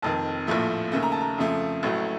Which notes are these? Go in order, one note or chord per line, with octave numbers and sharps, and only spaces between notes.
F1 F2 D#3 A5
A#1 A2 F3 A3
D#2 C#3 A3
A#5
A5
A#5
F2 C#3 F3 A3
A1 A2 F#3 A3